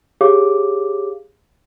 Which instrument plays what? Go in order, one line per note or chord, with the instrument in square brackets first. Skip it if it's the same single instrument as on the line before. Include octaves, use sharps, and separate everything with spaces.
[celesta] G4 G#4 C#5 F5 D6